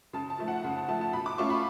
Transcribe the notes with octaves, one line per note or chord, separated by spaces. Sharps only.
C#3 A5
A5
F3 A3
F#5
C#3
A5
F3 A3 A5
A5
B2 B5
D6
A3 C#4 F4 C#6
B5